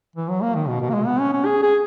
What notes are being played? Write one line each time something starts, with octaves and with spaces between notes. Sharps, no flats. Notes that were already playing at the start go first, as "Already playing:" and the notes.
E3
F#3
A#3
D#3
B2
B2
A#3
G#3
B3
C#4
C#4
G#4
G#4